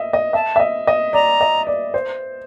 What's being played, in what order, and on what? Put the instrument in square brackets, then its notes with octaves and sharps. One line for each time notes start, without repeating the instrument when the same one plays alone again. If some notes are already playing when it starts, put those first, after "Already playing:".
Already playing: [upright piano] D#5 E5
D#5
[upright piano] E5 [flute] A5
[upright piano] E5
D#5
D#5
[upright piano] D5 [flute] A#5
[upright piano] D#5
D5
C5